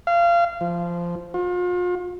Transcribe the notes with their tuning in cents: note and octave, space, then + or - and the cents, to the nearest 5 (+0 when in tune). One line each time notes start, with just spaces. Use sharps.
F5 -25
F3 -10
F4 +40